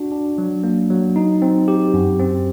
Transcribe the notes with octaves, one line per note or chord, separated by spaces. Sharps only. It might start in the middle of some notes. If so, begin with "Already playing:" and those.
Already playing: D4 F#4
D4
F#3
A#3
F#3
D#4
C4
G4
F#2
C4